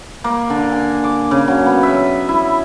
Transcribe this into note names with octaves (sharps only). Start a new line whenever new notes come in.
A#3
D3
G#5
D6
C#3
F#3
B3
E5
E4